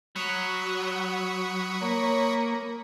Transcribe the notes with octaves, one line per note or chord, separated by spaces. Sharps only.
F#3 B5 C#6 D#6
A#3 C#5